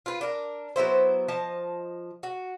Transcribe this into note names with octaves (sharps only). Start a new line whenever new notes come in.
F4 B4
D4 A#4
F#3 B3 E4 C5
F3 D#5 A5
F#4